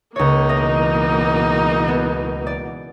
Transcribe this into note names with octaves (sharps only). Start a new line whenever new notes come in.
C#2 A#3 D#4 C#5
B2 E3 D#5
B3
D5